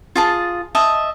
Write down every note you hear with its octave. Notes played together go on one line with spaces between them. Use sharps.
F4 G#4 A5
D#5 E5 A5